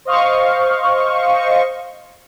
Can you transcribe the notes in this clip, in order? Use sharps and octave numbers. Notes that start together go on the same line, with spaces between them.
C5 D#5 F5 C#6